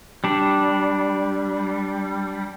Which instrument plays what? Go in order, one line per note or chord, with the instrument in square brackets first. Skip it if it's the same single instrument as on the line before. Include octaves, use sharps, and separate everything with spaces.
[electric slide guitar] G3 D4